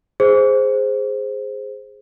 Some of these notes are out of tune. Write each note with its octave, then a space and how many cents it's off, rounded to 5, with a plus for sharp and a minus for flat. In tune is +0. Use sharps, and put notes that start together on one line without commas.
G#4 -5 C5 +0